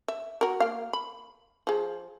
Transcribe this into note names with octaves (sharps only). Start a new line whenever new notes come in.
E5
F#4 A#4
A#3 F5
B5
F3 G#4